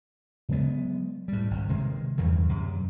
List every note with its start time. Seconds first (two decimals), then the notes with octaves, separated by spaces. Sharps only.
0.49 C#3 F#3 G#3 B3
1.28 A2 G3
1.51 G#1 F#2
1.69 C3 D#3 G#3
2.18 E2 G2 D#3 E3
2.49 F#2 C3